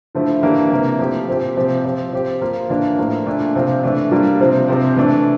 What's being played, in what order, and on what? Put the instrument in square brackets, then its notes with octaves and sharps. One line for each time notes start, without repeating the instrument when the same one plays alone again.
[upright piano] D3 F3 A3 E4
E3 A#3 D4 G4
C3 E3 A#3
F3 A3 C4 G4
A#2 F3 C4 G4
C3 F3 C4 G4
F3 C4 G4
F3 C4 G4
F3 A#3 F4
E3 A#3 D4 F4
A2 F3 A#3
A#2 A3 D4
C3 F3 C4 F4
E3 A3 D4
G3 A#3 D4 F4
C3 F3 C4 F4
C3 F3 C4
E3 A3 D4